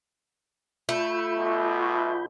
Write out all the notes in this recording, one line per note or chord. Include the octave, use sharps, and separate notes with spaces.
A3 F4 B5 G6
B1 B2